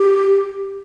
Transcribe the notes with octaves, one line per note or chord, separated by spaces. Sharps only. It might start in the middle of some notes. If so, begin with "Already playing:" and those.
Already playing: G4